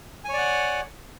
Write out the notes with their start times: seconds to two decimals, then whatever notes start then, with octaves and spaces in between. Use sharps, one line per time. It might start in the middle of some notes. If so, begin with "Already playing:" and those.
0.25 G#5
0.29 C#5
0.33 D5
0.38 F#5